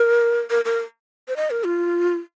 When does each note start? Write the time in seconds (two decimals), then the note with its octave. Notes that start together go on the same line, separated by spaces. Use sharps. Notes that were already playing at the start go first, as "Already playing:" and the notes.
Already playing: A#4
0.50 A#4
0.65 A#4
1.28 C5
1.37 D#5
1.51 A#4
1.65 F4